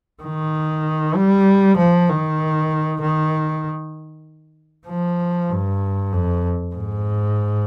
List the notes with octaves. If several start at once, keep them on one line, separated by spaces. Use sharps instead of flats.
D#3
G3
F3
D#3
D#3
F3
G2
F2
G#2